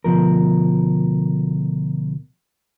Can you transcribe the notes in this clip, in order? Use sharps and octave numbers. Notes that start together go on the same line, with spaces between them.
D2 B2 F3 A#4